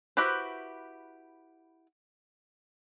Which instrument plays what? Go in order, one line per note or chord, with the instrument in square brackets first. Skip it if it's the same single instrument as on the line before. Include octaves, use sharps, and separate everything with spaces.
[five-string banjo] E4 F#4 G4 B4 C5